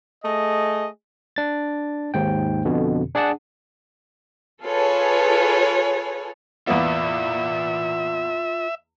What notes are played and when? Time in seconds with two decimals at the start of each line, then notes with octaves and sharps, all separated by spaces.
0.24 A3 G#4 D#5
1.36 D4 A6
2.14 D#2 G#2 G5
2.65 F2 B2 D3
3.15 D4 G#4 D5 F#5 A5
4.64 F4 G#4 A4 B4 C#5
6.67 E2 A#3 B3 F4 D5 E5